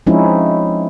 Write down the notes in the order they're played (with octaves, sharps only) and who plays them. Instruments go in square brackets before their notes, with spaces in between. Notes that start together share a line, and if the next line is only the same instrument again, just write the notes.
[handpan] F3 G#3 C4 C#4 D#4 E4